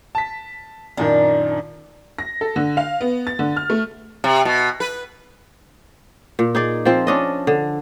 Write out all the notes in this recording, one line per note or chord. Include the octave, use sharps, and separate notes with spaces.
A5 B6
F#2 A#2 D#3 D4
A#6
A4
D3
F5
B3
A6
D3
F6
A3
C3
B2
B4
A#2
D#4 G#4 D5
F3 C4
C#4 D4 D#5
D3